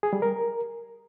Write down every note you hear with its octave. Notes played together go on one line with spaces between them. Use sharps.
G#4
G3
A#4